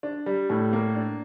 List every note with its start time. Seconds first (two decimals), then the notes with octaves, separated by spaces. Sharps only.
0.03 D4
0.26 G3
0.50 A2
0.73 A#3
0.95 D4